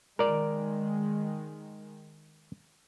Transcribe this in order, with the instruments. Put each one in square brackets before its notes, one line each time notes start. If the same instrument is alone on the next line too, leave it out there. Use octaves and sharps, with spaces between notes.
[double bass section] D#3 G#3 [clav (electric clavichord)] A#4 D5